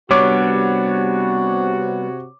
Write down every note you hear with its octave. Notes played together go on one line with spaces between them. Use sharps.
C3 G3 B3 D4 F#4 C#5 D6